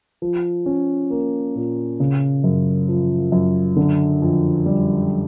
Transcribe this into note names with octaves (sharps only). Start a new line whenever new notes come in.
F3
C#4
A#3
A#2
C#3
F#2
F3
F#2
D3
F2
G3